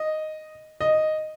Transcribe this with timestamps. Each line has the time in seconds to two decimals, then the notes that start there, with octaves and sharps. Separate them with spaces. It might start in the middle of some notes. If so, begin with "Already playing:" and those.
Already playing: D#5
0.81 D#5